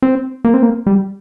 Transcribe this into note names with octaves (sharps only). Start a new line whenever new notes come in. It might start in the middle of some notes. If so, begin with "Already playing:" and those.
C4
A#3
C4
A#3
G3